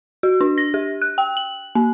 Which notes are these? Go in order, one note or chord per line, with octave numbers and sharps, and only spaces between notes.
F#4
D4
A#6
G4
F#6
G5
F#7
A#3